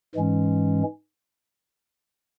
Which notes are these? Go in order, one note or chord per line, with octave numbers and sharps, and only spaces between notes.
G#2 E3 G#3 C#4